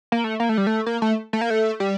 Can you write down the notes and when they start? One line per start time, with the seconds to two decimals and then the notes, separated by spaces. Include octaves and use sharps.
0.12 A#3
0.24 A3
0.40 A#3
0.49 A3
0.58 G3
0.67 A3
0.86 A#3
1.02 A3
1.33 A3
1.41 A#3
1.50 A3
1.80 G3